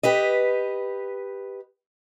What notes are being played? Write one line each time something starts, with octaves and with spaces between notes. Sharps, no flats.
G4 B4 D#5